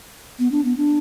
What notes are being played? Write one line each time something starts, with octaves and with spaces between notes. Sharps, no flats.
B3
D4
B3
D4